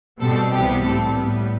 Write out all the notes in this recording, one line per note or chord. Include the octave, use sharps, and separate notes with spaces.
B2 G3 C4 A4
C2 C3 E3 G3 B3 G4
A2 G3 C4 A4
A2 G3 B3